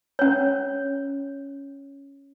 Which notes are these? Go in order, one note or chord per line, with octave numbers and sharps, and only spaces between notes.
C#4 C#5